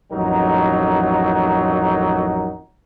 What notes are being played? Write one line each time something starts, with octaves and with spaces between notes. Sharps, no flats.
A1 F2 F#3 D#4 A#4